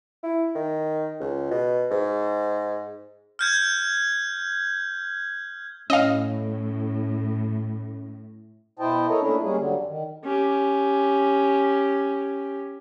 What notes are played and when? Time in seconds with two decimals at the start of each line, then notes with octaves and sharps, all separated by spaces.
0.23 E4
0.55 D#3
1.20 C#2
1.51 B2
1.91 G#2
3.39 F6 G6 G#6
5.90 A2 C#4 D#5 F5
8.79 B2 E4 C5 D#5 G5 A5
9.08 A4 A#4 C#5 D#5
9.20 A#2 A3 C#4 D4 E4
9.41 G3 G#3 A#3 C#4 G#4
9.57 G2 D3 F#3 G3
9.86 D#3
10.24 C#4 G4